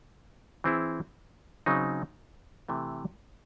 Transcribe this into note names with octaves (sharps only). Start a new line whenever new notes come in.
E3 C4 E4 G#4
C#3 F#3 C4 D#4
C3 E3 A3